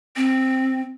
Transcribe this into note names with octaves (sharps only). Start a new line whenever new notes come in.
C4